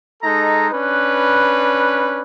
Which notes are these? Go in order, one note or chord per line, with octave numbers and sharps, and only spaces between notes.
G#3 D#4 A4 A#5
C#4 D4 B4